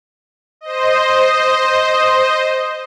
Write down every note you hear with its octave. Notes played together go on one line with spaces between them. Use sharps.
C5 D#5